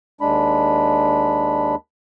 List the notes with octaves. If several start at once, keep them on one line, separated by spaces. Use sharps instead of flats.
D#2 G#3 D4 B5